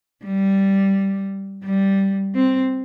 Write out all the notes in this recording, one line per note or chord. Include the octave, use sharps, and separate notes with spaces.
G3
G3
C4